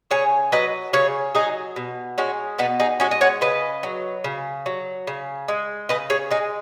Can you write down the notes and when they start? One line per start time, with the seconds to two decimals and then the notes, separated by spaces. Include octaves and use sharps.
0.11 C#3 G#4 C#5
0.52 F#3 B4 D#5
0.93 C#3 G#4 C#5
1.35 F#3 D#4 G#4
1.76 B2
2.18 G#3 C#4 F#4
2.58 B2 B3 D#4
2.80 D#4 G#4
3.00 G#3 C#4 F#4
3.11 D#5
3.21 C#5 F#5
3.41 C#3 B4 D#5
3.83 F#3
4.24 C#3
4.66 F#3
5.07 C#3
5.48 G#3
5.89 C#3 B4 D#5
6.10 G#4 C#5
6.31 G#3 D#4 G#4